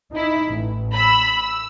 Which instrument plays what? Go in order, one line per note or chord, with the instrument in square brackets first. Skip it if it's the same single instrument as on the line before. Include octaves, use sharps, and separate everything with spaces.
[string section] D#4 E4
A1
B5 E6
E6